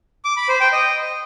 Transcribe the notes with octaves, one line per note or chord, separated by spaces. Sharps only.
D6
B5
C5
G5
D#5